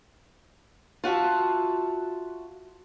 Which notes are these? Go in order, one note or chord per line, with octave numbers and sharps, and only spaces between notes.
F4 F#4 E5 A5